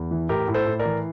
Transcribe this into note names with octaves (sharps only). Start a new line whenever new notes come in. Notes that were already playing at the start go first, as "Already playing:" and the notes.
Already playing: E2
E3
A2 G4 A#4
A2
A4 C5
A2
A#4 D5
E3